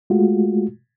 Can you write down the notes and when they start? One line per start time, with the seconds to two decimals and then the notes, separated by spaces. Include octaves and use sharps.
0.10 G#3 A3 F4 F#4